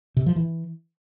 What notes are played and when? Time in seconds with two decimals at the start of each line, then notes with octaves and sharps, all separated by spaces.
0.17 C3
0.26 F3
0.36 E3